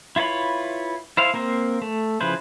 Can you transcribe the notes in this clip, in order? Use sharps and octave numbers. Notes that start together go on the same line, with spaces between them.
E4 F4 B4 C#5 B5
E4 C5 F5
A#3 C4 A#4 C5
A3
C#3 F3 E4 B4 C5